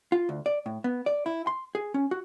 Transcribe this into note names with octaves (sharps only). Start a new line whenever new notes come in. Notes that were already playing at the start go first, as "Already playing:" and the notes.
F4
D2
D5
A2
B3
D5
E4
C6
G#4
C#4
F#4